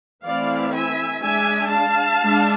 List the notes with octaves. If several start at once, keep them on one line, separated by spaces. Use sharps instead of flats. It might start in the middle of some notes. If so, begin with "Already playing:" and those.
E3 A3 C4 E4 D5 F5
E5 G#5
G#3 D4 E5 G#5
F5 A5
G#3 D4